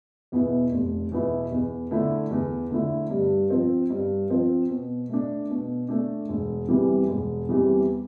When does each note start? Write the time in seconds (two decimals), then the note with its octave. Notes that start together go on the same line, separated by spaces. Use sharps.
0.32 E2 B2 B3 E4
0.71 F1
1.12 E2 B2 B3 E4
1.51 E2
1.91 D3 A3 E4
2.31 E2
2.71 D3 A3 E4
3.10 G2
3.50 F3 C4
3.90 G2
4.30 F3 C4
4.69 B2
5.10 A3 D4
5.50 B2
5.88 A3 D4
6.29 E1
6.68 E2 C3 E3 G3
7.08 E1
7.49 E2 C3 E3 G3